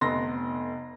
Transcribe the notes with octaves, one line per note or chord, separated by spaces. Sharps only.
F1 B3 C6 A#6